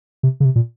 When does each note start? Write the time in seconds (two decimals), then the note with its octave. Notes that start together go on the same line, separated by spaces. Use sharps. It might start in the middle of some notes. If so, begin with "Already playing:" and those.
0.23 C3
0.40 C#3
0.45 C3
0.56 A#2